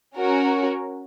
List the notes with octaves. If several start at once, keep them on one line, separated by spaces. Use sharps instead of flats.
C#4 F#4 A#4